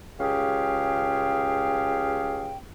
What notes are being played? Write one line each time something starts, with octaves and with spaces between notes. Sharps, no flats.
C#2 C#4 G4 G#4 F5 G5